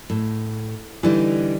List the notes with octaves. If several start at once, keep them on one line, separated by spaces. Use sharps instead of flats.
A2
D3 E3 G3 D#4